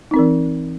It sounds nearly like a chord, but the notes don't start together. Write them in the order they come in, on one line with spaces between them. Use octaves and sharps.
D#4 C4 A#4 E3